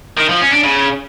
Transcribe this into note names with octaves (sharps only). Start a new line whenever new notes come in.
D#3
F3
C#4
D4
C#3